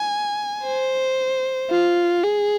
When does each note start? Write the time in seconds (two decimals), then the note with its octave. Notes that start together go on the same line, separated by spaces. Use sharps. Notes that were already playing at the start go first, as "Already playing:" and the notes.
Already playing: G#5
0.65 C5
1.70 F4
2.24 G#4